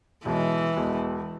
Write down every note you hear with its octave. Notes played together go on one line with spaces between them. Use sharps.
B1 B2 E3 G#3
E1 E2 B2 G#3